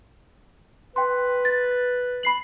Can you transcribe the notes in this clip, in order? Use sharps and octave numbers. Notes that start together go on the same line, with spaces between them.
B4 G5 C6
A6
B5 C7 F#7